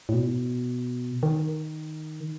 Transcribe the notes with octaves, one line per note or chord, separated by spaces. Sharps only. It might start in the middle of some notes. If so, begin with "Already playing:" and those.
A2
B2
D#3